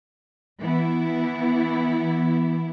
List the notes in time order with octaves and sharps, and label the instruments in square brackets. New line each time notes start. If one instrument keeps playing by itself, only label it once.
[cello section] E3 B3 E4